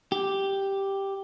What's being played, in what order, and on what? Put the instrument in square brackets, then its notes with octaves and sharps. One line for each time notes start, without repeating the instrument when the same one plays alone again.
[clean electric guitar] G4